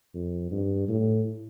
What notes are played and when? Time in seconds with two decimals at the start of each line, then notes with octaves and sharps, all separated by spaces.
0.14 F2
0.51 G2
0.88 A2